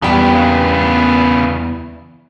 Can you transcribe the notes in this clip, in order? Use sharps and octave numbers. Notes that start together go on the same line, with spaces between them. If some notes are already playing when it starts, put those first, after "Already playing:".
E2 C#3 G3 B3 G5